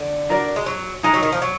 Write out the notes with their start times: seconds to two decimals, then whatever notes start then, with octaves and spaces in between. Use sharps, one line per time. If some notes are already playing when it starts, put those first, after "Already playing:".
Already playing: D3
0.29 D4 F#4 A#4 D5
0.56 G#3
0.66 F#3
1.03 G#3 D#4 G#4 D#5 A#5
1.14 F#3
1.23 D#3
1.32 F3
1.42 F#3